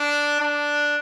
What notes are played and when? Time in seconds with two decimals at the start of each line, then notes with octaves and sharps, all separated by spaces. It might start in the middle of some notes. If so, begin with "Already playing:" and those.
Already playing: D4
0.40 D4